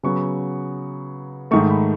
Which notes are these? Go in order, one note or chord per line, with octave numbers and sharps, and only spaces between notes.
C#3 F#3 B3 C#6
G#2 D#3 A3 C#6
B5